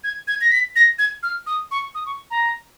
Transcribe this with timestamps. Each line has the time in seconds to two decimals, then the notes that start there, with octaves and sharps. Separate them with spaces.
0.04 G#6
0.28 G#6
0.41 A#6
0.52 B6
0.76 A#6
0.99 G#6
1.23 F6
1.46 D#6
1.71 C#6
1.95 D#6
2.06 C#6
2.31 A#5